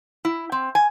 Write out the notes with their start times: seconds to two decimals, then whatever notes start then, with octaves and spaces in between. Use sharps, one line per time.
0.25 E4
0.52 C4
0.75 G#5